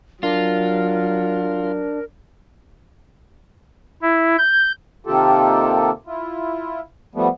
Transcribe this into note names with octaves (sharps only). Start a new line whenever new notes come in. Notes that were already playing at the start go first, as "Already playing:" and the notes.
F#3 D4 F4 A#4
E4
G6
C3 D#3 A#3 F4 G4 A4
E4 F4
F3 G3 A3 B3